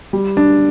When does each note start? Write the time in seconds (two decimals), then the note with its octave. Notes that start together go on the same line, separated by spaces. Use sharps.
0.13 G3
0.37 D4